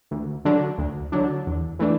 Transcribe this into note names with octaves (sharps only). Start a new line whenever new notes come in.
D2
D3 F#3 D4
D2
D3 F#3 D4
E2
E3 A3 D4